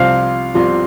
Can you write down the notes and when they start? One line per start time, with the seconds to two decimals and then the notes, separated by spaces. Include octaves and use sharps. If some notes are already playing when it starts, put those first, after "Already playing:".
Already playing: C2 C3 F3 C4 F4 F5
0.54 C2 C3 F3 C4 F4